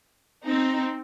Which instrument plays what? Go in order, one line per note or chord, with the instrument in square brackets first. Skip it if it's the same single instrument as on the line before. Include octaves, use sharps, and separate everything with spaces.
[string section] C4 D#4